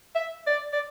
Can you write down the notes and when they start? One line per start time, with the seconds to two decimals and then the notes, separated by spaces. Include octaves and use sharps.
0.15 E5
0.47 D5
0.73 D5